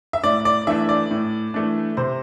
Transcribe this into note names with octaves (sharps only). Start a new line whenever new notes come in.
E5
A2 D5
D5
E3 A3 D4 E5
D5
A2
E3 A3 D4
C3 C5